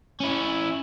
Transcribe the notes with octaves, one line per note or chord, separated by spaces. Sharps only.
C#4 E4